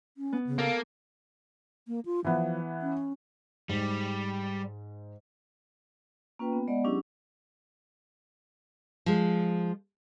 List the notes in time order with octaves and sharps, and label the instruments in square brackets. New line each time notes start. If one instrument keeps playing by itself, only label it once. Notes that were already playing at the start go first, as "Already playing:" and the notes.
[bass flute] C#4
[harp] B3
[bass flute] C#3
[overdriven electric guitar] A#3 [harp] A4 F5
[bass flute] A#3
F4
[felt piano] E3 B3 [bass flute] F3
[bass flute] C#4
[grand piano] G#2 [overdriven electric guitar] G3
[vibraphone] A#3 C#4 F4 B4 G5
B3
G#3 B3 D5 D#5 F#5
F#3 C#4 D4 E4 G4 G#4
[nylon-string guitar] F3 G#3